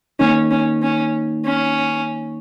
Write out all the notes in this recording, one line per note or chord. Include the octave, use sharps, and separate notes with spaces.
D#3 A#3 C#4 D#4
C#4
C#4
C#4